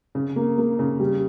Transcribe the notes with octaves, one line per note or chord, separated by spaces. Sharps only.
C#3
A#3
A#3
C#3
G3